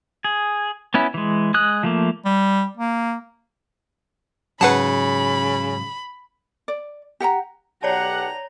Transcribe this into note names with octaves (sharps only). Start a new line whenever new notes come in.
G#4
B3 C#4 E4
E3 G#3
G#3 D#6 F#6
F3 A3 A#3
G3
A#3
G#2 C#3 F#3 B4 F#5 A5 B5
D5
G4 F#5 G5 A#5
B1 G4 C#5 D5 F#5 A5 A#5